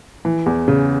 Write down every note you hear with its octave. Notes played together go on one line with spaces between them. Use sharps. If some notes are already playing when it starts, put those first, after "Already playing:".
E3
E2
C#3